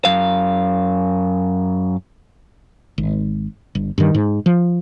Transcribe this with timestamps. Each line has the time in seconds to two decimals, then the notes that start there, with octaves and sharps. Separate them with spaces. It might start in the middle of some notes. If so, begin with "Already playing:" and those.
0.05 F#2 F5
2.98 G#1
3.75 G1
3.98 G2 D#3
4.15 G#2
4.46 F3